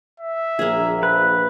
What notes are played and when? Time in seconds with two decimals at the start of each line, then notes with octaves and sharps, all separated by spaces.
0.20 E5
0.59 A#1 A#3 G#4
1.03 B4